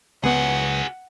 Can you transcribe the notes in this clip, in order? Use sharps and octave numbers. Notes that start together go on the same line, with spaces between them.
C#2 B3 F#4 G#4 F#5